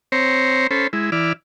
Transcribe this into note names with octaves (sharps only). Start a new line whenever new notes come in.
C4 C5 C#5 A#5
C#4 A4 C5 B5
G#3 E4
E3 E4 D5 F6